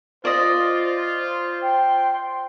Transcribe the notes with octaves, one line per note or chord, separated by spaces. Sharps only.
F4 C5 D5 D#5
G5 C6